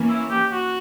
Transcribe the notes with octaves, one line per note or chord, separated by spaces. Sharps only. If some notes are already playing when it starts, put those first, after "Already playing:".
Already playing: E3 A#3 C#4
E4
G4
F#4